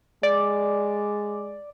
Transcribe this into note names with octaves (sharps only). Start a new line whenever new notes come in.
G#3 D5